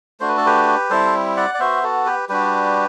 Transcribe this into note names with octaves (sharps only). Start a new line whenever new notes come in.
A3 D4 F#4 C5
B4
A4
G4 B4
G3 C4 E4 A4 C5
D5 F#5
D5
B3 F#4 C5 E5
F#4 A4
G4 B4
G3 D4 F#4 G4 B4